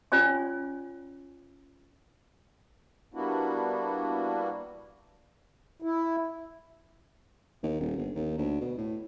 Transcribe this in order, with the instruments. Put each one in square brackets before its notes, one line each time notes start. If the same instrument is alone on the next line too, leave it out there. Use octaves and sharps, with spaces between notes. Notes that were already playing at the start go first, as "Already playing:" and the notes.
[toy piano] C#4 F4 C#5 D5 G#5
[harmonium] G3 A#3 B3 D4 E4 F#4
E4
[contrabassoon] D#2
D#1
G1
D#2
D2
B2
A2